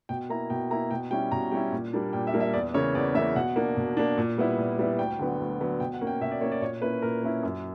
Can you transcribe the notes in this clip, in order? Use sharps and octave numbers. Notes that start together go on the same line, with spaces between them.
B2 G5
A#3 E4 A#5
B2 G5
A#3 E4 A#5
B2 G5
G3 C#4 E4 G5
B2 A#5
G3 C#4 E4 G5
A#2
G3 A#3 D4
A#2 G5
E5
G3 A#3 D4
E5
E2 D5
C#3 E3 A#3 C#5
E2 D5
C#3 E3 A#3 E5
B2 F#5
A#3 D4
B2
A#3 D4
A#2
G3 B3 E4
A#2
G3 B3 E4
D2 G5
D3 F#3 B3
D2
D3 F#3 B3
B2 G5
F#5
A#3 C#4
G5
B2 E5
D5
A#3 C#4 C#5
D5
A#2 C#5
A#3 C#4 E4 B4
A#2 A#4
A#3 C#4 E4
F#2